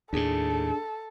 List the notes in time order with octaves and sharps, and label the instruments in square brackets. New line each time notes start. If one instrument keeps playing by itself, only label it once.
[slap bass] D#2 A2 [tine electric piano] D4 G#4 [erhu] A4